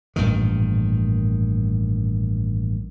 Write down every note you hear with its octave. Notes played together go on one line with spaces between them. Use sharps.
A1 G2 A#2 D#3